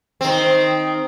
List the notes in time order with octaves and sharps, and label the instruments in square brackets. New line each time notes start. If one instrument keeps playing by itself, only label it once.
[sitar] D#3 C4